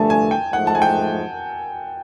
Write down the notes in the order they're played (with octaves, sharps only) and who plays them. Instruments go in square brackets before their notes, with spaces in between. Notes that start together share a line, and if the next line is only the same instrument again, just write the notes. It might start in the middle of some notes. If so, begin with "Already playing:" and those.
Already playing: [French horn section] G2 D3 F3 A3 [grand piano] G#5 A5
[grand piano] G#5
G5
[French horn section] G#2 F3 A3 [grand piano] F#5
[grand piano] A5
G#5
G5